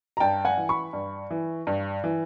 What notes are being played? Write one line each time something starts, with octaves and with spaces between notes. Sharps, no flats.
A#5
G2 G5 A5
F#5 G#5
E3
B5 C#6
G2
E3
G2
E3